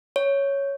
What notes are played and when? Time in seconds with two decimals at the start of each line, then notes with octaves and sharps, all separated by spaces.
0.16 C#5